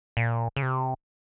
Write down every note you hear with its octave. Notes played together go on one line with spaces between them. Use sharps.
A#2
C#3
C3